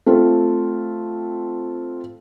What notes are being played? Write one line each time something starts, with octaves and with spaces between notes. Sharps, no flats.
A3 C4 F4 A4